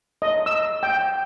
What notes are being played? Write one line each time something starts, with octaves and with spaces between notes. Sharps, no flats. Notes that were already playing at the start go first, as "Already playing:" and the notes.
D#5
E6
G5